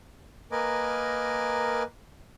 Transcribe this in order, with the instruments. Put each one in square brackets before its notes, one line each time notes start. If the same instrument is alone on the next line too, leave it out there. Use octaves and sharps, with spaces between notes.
[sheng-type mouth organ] A#3 A#4 B4 D#5 G#5 D6